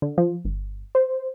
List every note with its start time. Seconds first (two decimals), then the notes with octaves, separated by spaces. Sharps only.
0.02 D3
0.18 F3
0.45 G1
0.95 C5